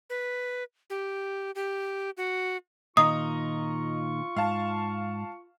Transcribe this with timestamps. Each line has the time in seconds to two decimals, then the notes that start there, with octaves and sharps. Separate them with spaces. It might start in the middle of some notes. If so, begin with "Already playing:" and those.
0.10 B4
0.90 G4
1.55 G4
2.17 F#4
2.97 A#2 D#3 F4 D#5 A#5 C#6 D#6
4.37 G#2 F5 A5